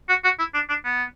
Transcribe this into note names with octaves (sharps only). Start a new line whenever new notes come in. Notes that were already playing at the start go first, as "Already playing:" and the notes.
F#4
F#4
E4
D4
D4
B3